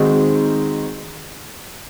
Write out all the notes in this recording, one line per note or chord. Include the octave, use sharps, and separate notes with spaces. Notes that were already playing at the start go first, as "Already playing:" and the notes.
Already playing: D#3 G#3 C4 D#4 F#4